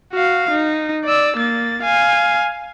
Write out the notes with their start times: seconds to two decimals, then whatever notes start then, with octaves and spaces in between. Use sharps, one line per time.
0.13 F#4 F5
0.51 D#4
1.05 D5 E6
1.37 A#3 A6
1.83 F5 G#5